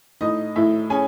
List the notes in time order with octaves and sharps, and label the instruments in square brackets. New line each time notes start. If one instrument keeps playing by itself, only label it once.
[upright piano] A2 D#4 D#5
A2 E4 E5
C#4 G#4 G#5